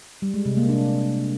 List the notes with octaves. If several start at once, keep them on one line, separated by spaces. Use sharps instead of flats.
G3
G#3
C3
A#3
D4